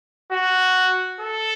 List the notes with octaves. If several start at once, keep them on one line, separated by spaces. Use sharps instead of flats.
F#4
A4